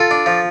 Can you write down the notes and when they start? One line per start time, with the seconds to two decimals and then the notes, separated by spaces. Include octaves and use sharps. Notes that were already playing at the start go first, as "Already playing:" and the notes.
Already playing: F4 A4
0.11 D4
0.26 F3